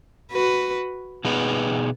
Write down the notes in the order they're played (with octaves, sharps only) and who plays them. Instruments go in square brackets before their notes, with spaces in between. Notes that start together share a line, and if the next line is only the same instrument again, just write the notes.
[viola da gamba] F#4 B4
[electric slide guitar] B2 B3 D#4 G#4 B4